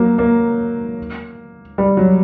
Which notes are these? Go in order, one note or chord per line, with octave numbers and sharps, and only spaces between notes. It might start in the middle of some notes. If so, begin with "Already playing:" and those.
Already playing: F#3 A#3
A#3
G3
F#3